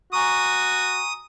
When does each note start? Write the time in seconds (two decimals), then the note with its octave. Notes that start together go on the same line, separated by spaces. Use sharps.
0.13 F#4 G#5 A#5 C#6 D#6